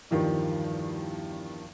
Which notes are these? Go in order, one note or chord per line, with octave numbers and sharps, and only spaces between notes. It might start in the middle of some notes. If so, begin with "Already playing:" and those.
E2 G2 D#3 F3 G3